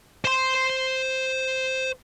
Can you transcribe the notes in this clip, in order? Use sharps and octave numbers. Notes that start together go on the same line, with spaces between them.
C5 C6